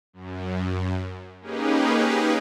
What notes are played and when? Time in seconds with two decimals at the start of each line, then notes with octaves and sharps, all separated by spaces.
0.13 F#2
1.41 A#3 C#4 D#4 G4 G#4 B4